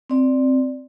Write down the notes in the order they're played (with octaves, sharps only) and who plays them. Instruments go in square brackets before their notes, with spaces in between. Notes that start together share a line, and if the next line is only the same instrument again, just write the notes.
[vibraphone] C4 D5